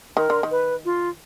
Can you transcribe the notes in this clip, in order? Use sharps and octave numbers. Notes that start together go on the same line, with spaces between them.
D#3 A#4
D3
D#3
B4
F4